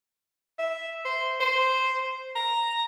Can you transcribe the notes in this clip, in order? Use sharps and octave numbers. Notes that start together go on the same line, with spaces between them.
E5
C5
C5
A#5